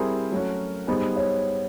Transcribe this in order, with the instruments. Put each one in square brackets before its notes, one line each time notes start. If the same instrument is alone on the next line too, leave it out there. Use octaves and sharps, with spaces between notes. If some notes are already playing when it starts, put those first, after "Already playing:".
Already playing: [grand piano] G3 C4 E4 G#4 C5 [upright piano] A#4
[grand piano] F#3 A3 C#4 F#4
[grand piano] G3 B3 D#4 G#4 [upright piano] C5
[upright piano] C#5